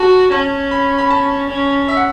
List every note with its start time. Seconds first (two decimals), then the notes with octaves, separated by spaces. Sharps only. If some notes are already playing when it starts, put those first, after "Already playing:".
Already playing: F#4 A5
0.31 C#4 A5
0.71 B5
0.98 B5
1.10 A5
1.49 C#4
1.88 E5
1.97 F#5